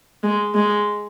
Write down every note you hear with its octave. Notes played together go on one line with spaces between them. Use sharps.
G#3
G#3